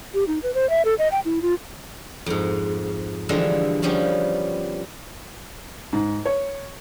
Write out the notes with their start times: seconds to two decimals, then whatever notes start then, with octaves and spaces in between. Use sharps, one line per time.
0.14 G4
0.28 D#4
0.43 B4
0.54 C5
0.70 E5
0.85 A4
0.99 D#5
1.12 G5
1.25 E4
1.42 F4
2.26 F2 G#2
3.29 D3 E3 F3 G3 G#3
3.82 F3 G3 B3 C#4 G4
5.93 G#2
6.25 C#5